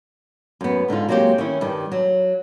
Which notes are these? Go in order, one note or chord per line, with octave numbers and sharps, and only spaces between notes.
F#2 B3
G#2 D3 D#4 F4
F#3 G#3 A#3 C4 G4
D#3 C#4 E4
G2 D#3
F#3